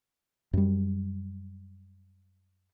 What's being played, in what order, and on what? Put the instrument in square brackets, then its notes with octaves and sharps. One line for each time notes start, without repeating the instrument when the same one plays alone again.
[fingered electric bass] F#2 G3